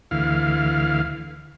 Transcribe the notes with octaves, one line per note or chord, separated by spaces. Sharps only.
D2 E3 F5